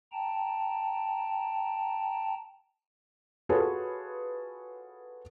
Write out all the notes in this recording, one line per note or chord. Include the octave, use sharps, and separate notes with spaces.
G5 A5 A#5
F4 F#4 G#4 A4 B4 C#5